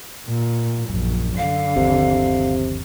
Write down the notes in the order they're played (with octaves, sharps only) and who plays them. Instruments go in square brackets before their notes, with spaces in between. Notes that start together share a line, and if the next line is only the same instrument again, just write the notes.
[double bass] A#2
[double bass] A#1 [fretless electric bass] F#2
[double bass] D3 [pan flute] F5
[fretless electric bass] G1 D#2 F3 [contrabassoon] C3